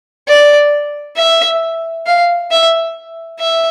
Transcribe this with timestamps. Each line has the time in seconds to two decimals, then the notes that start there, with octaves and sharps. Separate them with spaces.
0.28 D5
1.17 E5
2.06 F5
2.51 E5
3.39 E5